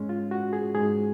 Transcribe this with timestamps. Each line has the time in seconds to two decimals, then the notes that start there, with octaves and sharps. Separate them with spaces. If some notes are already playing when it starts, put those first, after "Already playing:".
Already playing: G#2 G#3 C#4
0.09 F4
0.31 F#4
0.53 G#4
0.75 G#2 G#3 G#4